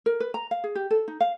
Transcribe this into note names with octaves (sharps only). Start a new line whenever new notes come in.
A#4
B4
A#5
F5
G#4
G4
A4
D#4
F5